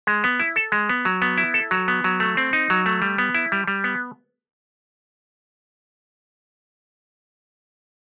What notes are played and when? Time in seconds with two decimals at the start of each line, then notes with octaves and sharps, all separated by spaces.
0.07 G#3
0.24 B3
0.40 E4
0.56 A4
0.72 G#3
0.89 B3
1.05 F#3
1.22 B3
1.38 E4
1.54 A4
1.71 F#3
1.88 B3
2.04 F#3
2.20 A3
2.37 C4
2.53 D#4
2.70 F#3
2.86 A3
3.02 G3
3.18 B3
3.35 E4
3.52 G3
3.67 G3
3.84 B3